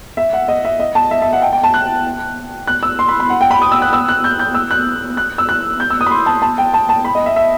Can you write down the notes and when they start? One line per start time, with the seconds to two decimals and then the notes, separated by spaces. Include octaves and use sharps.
0.17 E5
0.33 F#5
0.48 D#5
0.65 E5
0.79 D#5
0.95 A5
1.11 E5
1.22 E5
1.33 F#5
1.42 G5
1.53 G5
1.64 A5
1.74 F#6
2.67 F#6
2.83 E6
2.99 C6
3.09 B5
3.20 B5
3.29 F#5
3.41 G5
3.51 B5
3.62 D#6
3.72 E6
3.82 F#6
3.93 E6
4.09 F#6
4.24 G6
4.39 G6
4.54 E6
4.71 F#6
5.17 F#6
5.38 E6
5.49 F#6
5.80 G6
5.90 E6
6.01 D#6
6.06 B5
6.11 C6
6.26 A5
6.42 A5
6.58 G5
6.74 A5
6.89 A5
7.05 B5
7.15 D#5
7.26 E5
7.36 E5